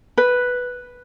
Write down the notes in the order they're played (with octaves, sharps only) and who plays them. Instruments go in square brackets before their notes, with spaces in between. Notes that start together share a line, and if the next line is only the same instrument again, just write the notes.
[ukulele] B4